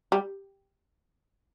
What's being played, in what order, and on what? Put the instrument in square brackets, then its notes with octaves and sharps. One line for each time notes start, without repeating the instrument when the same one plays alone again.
[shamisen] G3